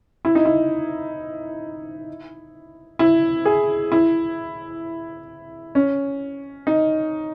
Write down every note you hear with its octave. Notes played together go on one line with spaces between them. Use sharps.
E4
D#4
E4
E4
G#4
E4
C#4
D#4